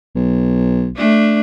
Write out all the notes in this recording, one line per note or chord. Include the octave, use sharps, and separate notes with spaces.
B1
A3 D4